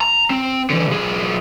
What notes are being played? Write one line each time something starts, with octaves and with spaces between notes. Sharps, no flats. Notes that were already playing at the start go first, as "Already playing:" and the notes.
A#5
C4
D3 E3
B1 G#4